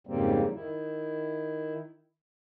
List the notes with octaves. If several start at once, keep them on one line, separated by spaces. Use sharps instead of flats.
F2 G#2 C#3 G3 A#3 C4
D#3 E4